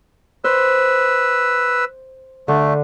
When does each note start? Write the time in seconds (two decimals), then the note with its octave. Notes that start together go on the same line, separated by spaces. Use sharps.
0.44 B4 C5 E6
2.48 D3 A3